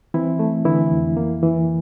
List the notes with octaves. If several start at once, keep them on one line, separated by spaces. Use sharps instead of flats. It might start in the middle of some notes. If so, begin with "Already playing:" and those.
E3 C4 E4
A3
D3 E3 E4
F2
A#3
E3